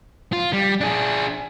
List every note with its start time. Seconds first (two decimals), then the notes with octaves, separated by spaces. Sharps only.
0.33 F4
0.53 G3
0.81 D4 G#4